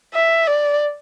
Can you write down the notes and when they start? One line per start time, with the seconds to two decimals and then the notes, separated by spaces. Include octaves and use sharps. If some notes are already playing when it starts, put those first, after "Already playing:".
0.14 E5
0.47 D5